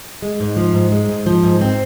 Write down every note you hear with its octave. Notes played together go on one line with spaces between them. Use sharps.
G#3
G#2
F3
G#2
G#3
G#2
F3
G#2
C4